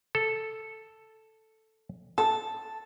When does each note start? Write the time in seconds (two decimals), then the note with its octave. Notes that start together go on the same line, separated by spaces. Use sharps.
0.15 A4
2.18 A4 A5